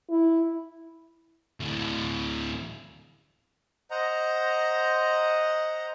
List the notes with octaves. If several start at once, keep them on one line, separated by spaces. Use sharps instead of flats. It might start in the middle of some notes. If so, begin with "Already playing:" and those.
E4
D2 A2
C5 D#5 F#5 A#5